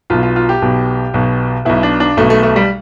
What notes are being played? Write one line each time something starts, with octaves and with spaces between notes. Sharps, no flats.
B1 B2 F4
F4
F4
G4
B1 B2
B1 B2
B1 B2 E4
D4
D4
B1 B2 A3
A3
A3
G3